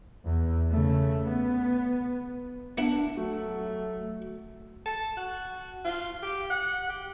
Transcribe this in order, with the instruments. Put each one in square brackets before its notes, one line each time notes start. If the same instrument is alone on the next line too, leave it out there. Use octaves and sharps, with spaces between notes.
[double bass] E2
C#3 A3
B3
[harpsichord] B3 E4 B4 [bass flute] D4
[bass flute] F#3 [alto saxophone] A3 [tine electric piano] F#4
[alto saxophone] A5
F#4
F4
G4
F#5
G4